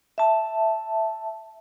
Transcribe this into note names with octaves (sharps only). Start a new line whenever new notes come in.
E5 A5